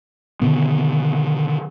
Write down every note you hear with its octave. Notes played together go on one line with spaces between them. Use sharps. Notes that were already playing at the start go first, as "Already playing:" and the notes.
B2 D3 D#3 B3